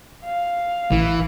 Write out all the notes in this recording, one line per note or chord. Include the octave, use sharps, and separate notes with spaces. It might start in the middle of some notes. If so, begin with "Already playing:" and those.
F5
A1 E3